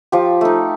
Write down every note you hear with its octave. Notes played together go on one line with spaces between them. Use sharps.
F3 G4
A3 D#4